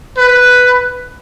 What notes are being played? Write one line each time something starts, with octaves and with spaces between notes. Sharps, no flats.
B4